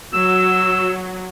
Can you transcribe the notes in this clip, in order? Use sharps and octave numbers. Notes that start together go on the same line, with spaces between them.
F#3 E6